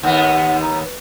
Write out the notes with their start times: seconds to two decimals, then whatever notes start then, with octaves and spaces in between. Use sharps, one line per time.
0.03 D#2 B3 F#5
0.62 A#5
0.85 B4